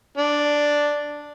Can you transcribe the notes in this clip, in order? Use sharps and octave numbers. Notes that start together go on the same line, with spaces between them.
D4